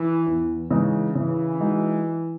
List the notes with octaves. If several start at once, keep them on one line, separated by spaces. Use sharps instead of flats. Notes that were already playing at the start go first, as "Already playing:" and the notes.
Already playing: E3
E2
C#3 E3 G#3 D#4
C#3 E3
G#3 D#4 F#4